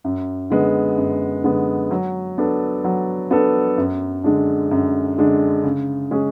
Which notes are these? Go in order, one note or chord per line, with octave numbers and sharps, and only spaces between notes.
F#2
D3 G#3 B3
F#2
D3 G#3 B3
F#3
B3 D4 A4
F#3
B3 D4 A4
F#2
D3 G#3 D4
F#2
D3 G#3 D4
C#3
G#3 C#4 G#4